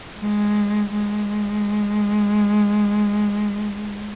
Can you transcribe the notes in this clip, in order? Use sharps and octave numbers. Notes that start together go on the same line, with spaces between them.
G#3
G#3